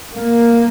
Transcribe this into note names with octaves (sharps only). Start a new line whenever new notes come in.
A#3